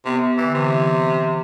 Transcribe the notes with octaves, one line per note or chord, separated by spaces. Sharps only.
C3 B3
B3
D3 E3
C3 E3